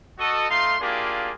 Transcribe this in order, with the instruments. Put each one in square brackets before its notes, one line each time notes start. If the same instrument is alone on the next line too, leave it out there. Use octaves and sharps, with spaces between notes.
[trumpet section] F#4 A4 D#5
A3 D#4 F4 F5 C6
A#3 D4 E4 F4 G4 G#4